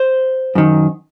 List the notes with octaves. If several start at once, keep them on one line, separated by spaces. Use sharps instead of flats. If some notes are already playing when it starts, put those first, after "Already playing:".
Already playing: C5
F#2 D#3